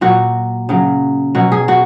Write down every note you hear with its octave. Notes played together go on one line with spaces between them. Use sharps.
A#2 F#3 F#4
C#3 F#3
B2 F#3 F#4
G#4
F#4